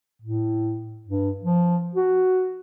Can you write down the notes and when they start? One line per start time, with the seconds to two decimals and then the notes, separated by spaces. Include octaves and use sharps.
0.22 A2
1.07 G2
1.44 F3
1.95 F#4